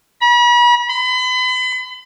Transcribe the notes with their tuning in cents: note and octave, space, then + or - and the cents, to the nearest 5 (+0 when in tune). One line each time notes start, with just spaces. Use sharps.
B5 -40
B5 +40